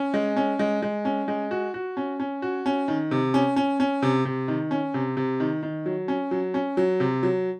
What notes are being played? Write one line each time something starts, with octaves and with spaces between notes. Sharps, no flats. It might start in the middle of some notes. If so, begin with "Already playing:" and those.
Already playing: C#4
G#3
C#4
G#3
G#3
C#4
G#3
F#4
F#4
C#4
C#4
F#4
C#4
D#3
C3
C#4
C#4
C#4
C3
C3
D#3
C#4
C3
C3
D#3
D#3
F#3
C#4
F#3
C#4
F#3
C3
F#3